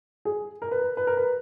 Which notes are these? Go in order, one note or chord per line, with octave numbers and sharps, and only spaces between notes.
G#4
A#4
B4
A#4
B4
A#4
B4